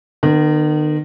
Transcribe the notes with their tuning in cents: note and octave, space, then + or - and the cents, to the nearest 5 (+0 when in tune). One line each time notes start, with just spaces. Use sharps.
D#3 -45 B3 +0